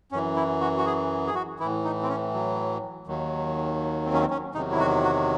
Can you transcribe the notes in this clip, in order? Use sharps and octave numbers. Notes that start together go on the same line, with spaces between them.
F#2 E3 C#4
E4
F#4
F#4
G#4
G#4
F#4
A2 E3 E4
D#4
C4
C#4
F#3
D#2 D#3 F#3
C4
C#4
C4
C#4
E2 C3 D#3 F#3 D#4
E4
F#4
F#4